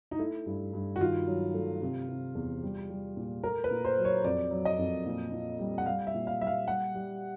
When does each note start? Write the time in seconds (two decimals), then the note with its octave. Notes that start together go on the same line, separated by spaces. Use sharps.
0.11 D#4
0.19 A3 E4
0.46 G2
0.73 G2
0.96 F#4
1.00 D#3 F4
1.27 F#3
1.54 A3
1.82 C3
2.09 C3
2.35 E2
2.63 G3
2.90 G3
3.17 A#2
3.43 A3 A#4
3.64 B4
3.71 A#2
3.85 C5
3.98 F#3
4.05 C#5
4.24 F2 D5
4.51 F#3
4.65 D#5
4.78 F2
5.06 A#2
5.32 A#2
5.59 G3
5.78 F#5
5.86 G3 F5
6.07 E5
6.14 A#2
6.27 F5
6.41 G3 E5
6.47 F5
6.68 G3 F#5
6.95 G3